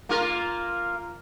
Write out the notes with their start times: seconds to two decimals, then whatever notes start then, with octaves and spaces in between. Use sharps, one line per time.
0.09 A#3 F4 A#4